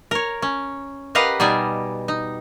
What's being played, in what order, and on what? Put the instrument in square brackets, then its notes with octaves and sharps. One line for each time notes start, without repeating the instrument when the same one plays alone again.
[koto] A#4 C#5
C#4
G4 A#4 B4 D#5 F5 F#5
B2 G3 D#4 D5 G#5
D#4